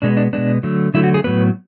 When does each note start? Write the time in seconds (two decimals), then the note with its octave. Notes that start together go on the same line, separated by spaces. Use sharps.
0.02 B2 G#3 B3 D4
0.17 D4
0.33 B2 G#3 B3 D4
0.63 D3 F#3 A3
0.94 D3 F#3 A3 E4
1.04 F#4
1.14 G#4
1.24 A2 F#3 B3 B4